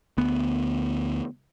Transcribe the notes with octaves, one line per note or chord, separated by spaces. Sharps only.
D2 B3